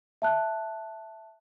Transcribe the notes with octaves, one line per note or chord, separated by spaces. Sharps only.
E5 A5 F#6